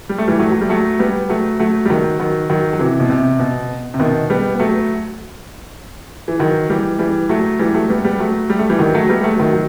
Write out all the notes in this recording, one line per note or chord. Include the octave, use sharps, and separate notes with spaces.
G3
A3
E3 G3
F#3 A3
F#3
G3
F#3 A3
G3 B3
F#3 A3
F#3 A3
G3
D#3 F#3
D#3 F#3
D#3 F#3
F#3
C3 E3
B2
C3
B2
C3
B2 D#3
G3 B3
B3
F#3 A3
E3
D#3 F#3
E3 G3
E3 G3
F#3 A3
E3 G3
F#3 A3
G3 B3
G3 B3
F#3 A3
G3
A3
E3 G3
D#3 F#3
F#3 A3
G3 B3
F#3 A3
D#3 F#3
F#3